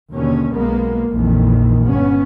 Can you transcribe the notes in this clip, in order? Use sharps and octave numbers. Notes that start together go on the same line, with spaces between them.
D#2 B2 D3 C#4
B1 G#3 A#3 B3
A#1 F2 A#2 D#3 E3
G1 G2 B3 C#4